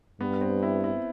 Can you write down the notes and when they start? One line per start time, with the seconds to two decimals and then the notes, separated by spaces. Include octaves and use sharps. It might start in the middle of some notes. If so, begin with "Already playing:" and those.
0.20 G2 B3
0.41 C4
0.63 E4
0.84 E4